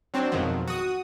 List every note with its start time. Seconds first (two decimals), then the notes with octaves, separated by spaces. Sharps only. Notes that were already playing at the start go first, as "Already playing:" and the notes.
0.14 F#3 C4 D4
0.32 G#1 F2 B2 D#3 F3 F#3
0.67 F#4 D#6